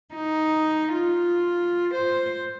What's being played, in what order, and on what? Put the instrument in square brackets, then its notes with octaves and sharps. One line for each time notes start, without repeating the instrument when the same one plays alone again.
[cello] D#4
F4
C5